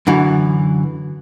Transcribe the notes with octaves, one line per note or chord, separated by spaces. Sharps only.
F#2 D3 E3